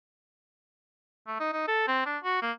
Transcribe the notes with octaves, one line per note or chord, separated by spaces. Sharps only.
A3
D#4
D#4
A4
C4
D4
F#4
A#3